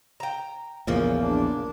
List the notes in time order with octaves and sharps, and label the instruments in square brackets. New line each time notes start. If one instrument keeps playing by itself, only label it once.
[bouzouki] G5 A#5
[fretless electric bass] A#1 E2 A#2 [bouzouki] C#3 F3 A#3
[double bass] D4